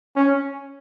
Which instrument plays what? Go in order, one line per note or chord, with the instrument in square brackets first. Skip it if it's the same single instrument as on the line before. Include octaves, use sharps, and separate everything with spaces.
[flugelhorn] C#4